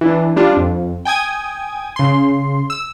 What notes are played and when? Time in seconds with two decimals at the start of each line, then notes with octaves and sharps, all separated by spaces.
0.01 E3 D4
0.36 G3 D4 F4
0.57 F2
1.05 G5 G#5 D#6 G#6
1.96 C#3 C6
2.70 E6